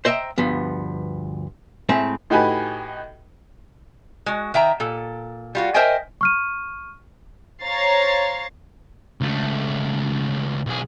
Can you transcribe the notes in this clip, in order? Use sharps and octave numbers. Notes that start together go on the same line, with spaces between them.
C5 D#5 E5 G5 A#5
D2 G2 F3 B3
A2 G#3 C4 E5 A#5
A2 D#4 F#4 G4 B4 G#5
G#3 F#4
D#3 E5 G5 A#5
A#2 A4
G3 F4 F#4
A#4 C5 D#5 E5 G5 G#5
C#6 F6 D#7
C5 C#5 F5 A#5 A6 C7
C#2 A3
B1 G#4